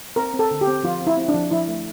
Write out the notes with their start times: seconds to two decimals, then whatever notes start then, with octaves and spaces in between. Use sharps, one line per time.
0.16 C4 A#4
0.34 C4
0.39 A4
0.51 D3
0.61 G4
0.67 C4
0.84 F3 F4
1.01 C4
1.07 E4
1.17 C4
1.28 D4
1.34 F3
1.51 F3 E4
1.68 A3